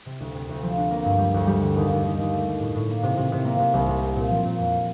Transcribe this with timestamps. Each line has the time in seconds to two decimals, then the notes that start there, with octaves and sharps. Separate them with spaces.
0.06 C3
0.20 D2
0.35 C3
0.49 D2
0.63 F3
0.78 D4
0.91 A#3
1.05 G2
1.19 G3
1.34 D2
1.47 G3
1.61 D3
1.76 D#2
1.91 D#2
2.04 D#2
2.18 D#2
2.32 A3
2.47 A3
2.60 A2
2.75 A2
2.89 A#3
3.03 C3
3.17 C3
3.32 C3
3.45 A#3
3.59 C3
3.74 C2
3.88 C3
4.01 C4
4.16 A#2
4.30 F3
4.45 A#2
4.58 F2